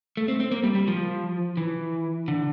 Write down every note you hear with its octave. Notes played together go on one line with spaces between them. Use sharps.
A3
C4
C4
A#3
G3
G3
F3
E3
D3